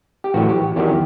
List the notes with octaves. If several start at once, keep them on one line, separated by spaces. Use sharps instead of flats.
G4
A1 A2 F#3 F#4
G4
E2 D#3 F#3 G4